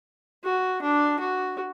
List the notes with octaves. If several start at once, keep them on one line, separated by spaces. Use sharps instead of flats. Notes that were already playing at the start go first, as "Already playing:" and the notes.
F#4
D4
F#4